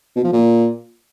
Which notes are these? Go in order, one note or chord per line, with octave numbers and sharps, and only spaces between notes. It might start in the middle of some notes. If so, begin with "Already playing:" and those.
B2
F3
A#2